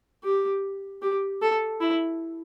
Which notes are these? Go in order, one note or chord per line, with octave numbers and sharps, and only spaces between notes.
G4
G4
A4
E4